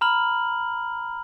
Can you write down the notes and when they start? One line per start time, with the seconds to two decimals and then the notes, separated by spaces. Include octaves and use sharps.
0.01 A#5 B5 F6 F#7